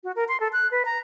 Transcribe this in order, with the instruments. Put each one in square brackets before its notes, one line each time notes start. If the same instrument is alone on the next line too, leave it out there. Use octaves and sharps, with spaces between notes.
[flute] F#4
A#4
C6
A4
F#6
B4
A#5